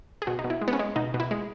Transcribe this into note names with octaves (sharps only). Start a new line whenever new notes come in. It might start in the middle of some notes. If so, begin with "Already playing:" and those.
G#4
B2 F#4
D#4
B2
E4
G#3
B3
C#4
G#3
B2 D#4
B2
E4
G#3